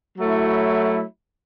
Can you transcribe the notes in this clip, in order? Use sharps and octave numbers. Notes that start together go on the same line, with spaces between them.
F#3 A3 E4